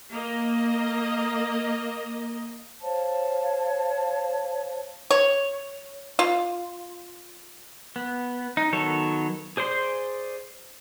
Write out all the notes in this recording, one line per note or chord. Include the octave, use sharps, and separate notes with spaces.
A#3 D#5
C5 C#5 F5 A5
C#5
F4
B3
D#4
D#3 F#3 B3 A4 C#5
G#4 C5 D5 C6